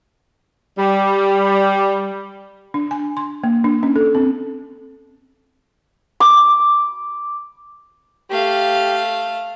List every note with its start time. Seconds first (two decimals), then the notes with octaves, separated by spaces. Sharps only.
0.78 G3
2.74 D4
2.91 G#5
3.17 C6
3.44 A#3
3.64 D4
3.83 C#4
3.96 A4
4.15 C4
6.20 D6
8.30 A3 G4 F5